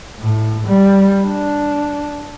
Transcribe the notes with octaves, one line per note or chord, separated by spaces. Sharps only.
A2
G3
D4